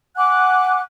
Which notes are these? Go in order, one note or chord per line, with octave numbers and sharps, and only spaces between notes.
F#5 G#5 D6 F#6